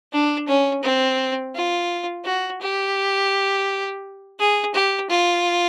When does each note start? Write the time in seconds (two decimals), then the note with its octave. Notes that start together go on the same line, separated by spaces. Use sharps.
0.13 D4
0.48 C#4
0.83 C4
1.55 F4
2.25 F#4
2.61 G4
4.39 G#4
4.74 G4
5.10 F4